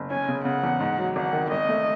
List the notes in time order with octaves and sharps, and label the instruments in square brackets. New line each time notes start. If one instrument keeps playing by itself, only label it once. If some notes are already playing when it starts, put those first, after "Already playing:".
Already playing: [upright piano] F#1
[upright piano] C#4 [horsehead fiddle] G#5
[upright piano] C#3
[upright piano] C#3 [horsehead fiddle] F#5
[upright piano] E2
G#2
F#3
[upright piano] G#1 [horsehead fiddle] F#5
[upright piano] D#3
[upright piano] G#1 [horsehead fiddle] D#5
[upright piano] A3